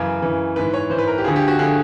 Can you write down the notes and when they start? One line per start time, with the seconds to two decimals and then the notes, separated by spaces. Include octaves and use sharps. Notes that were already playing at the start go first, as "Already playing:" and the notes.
Already playing: F#2 C#3 E3
0.22 F#2 C#3 E3
0.56 G#2 E3 B4
0.74 C#5
0.90 G#2 E3 C5
0.98 B4
1.07 A#4
1.18 G4
1.24 D2 D3 F3 G#4
1.36 G4
1.48 F#4
1.59 D3 F3 G#4